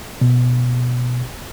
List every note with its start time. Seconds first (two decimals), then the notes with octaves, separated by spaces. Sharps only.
0.21 B2